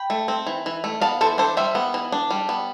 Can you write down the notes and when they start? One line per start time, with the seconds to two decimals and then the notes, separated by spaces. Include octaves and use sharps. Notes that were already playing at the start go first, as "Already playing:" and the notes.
Already playing: G5 B5
0.10 A3
0.28 C4
0.46 E3
0.66 E3
0.84 A3
1.01 B3 F5 A5
1.21 E3 A4 C5
1.38 D4 A4 C5
1.57 G3 C5 E5
1.75 B3
1.94 E3
2.12 D4
2.31 G3
2.49 B3